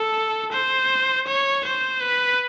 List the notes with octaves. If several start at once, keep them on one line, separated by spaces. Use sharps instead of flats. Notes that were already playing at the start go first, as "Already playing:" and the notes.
Already playing: A4
C5
C#5
C5
B4